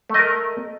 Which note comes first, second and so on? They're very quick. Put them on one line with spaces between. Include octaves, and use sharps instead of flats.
A3 D#5 A#4